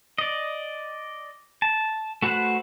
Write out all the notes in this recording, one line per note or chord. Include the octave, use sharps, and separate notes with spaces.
D5 D#5
A5
A3 F#4 B4 C5 F#5